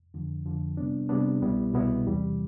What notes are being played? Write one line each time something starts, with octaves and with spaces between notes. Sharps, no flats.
F2 D3 F3
F2 D3 F3
C3 G3 B3 D4
C3 G3 B3 D4
C2 B2 G3 B3 E4
C2 B2 G3 B3 E4
E2 C3 E3 G3